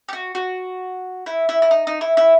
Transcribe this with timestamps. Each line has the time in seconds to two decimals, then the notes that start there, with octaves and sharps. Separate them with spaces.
0.09 G4
0.13 F#4
0.35 F#4
1.26 E4
1.49 E4
1.62 E4
1.71 D#4
1.87 D#4
2.01 E4
2.17 E4